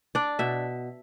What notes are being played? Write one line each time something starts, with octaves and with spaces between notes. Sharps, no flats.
D4 D5
B2 E5